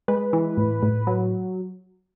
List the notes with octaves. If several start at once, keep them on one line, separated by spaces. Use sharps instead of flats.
G#3 B4
E3
A2
A2
F#3